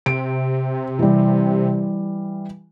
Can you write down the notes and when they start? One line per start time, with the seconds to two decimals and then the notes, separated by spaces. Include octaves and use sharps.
0.06 C3 D7
0.99 E3 G3